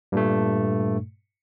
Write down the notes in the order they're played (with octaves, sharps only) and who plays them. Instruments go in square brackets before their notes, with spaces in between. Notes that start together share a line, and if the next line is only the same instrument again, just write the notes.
[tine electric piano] G2 A#2 A3